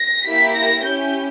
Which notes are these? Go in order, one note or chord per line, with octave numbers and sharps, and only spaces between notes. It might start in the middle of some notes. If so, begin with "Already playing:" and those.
Already playing: A#6
A#3 E4 G4 B6
A#6
C#4 E4 G4 G6